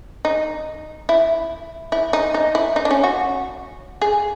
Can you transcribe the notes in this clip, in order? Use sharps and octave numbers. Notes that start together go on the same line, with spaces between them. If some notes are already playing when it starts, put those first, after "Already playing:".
D#4
E4
E4
D#4
D#4
E4
D#4
D4
C#4
F#4
G#4